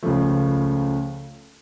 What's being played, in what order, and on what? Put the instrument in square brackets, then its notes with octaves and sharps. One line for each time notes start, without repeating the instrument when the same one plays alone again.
[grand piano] C#2 C#3 F3 A3